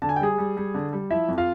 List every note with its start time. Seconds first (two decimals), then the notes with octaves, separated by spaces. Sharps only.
0.02 D3 A5
0.09 G#5
0.16 G5
0.20 G3 G#4 G#5
0.38 G3
0.57 G3
0.74 D3
0.93 G3
1.11 F3 E4 E5
1.28 F2
1.38 F4 F5